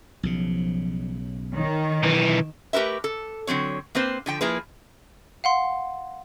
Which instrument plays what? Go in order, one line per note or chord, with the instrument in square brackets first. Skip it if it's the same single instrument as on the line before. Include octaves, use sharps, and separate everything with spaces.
[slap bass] B1 C#3 [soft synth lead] F3
[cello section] D#3 [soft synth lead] C#5
[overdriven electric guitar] B1 E3
[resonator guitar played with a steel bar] A3 G4 A#4 B4 E5
A4
D3 F#3 C4 C#5
A#3 C4 B4 C5
D3 F3 G5
F3 A#3 E4 G#4 B4
[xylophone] F5 F#5 C6